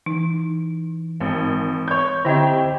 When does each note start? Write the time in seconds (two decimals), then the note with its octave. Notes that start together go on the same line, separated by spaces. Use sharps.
0.06 E3 D#4
1.20 G#1
1.88 C#5 G6
2.25 D3 C4 E4 G4 C5 D#5 G#6